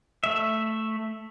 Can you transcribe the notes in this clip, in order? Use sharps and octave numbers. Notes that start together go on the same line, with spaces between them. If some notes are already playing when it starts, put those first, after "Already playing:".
A3 E5